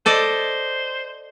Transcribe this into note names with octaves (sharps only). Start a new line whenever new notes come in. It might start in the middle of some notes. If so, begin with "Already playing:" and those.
A4 C5 D5 D#5